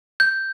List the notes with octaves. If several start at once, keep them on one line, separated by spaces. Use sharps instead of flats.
G6